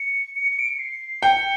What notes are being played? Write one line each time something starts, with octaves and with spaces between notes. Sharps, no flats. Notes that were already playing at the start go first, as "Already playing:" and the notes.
Already playing: C#7
C#7
D7
C#7
C7
G5 C#7